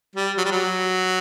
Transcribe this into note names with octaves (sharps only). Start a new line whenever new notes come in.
G3
F#3
G3
F#3